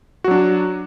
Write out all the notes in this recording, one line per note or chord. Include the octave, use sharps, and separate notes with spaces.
F#3 D4 F#4